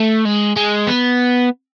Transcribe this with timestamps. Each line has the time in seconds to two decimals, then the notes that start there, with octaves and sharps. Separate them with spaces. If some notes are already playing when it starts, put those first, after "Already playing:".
Already playing: A3
0.25 G#3
0.57 G#3
0.87 B3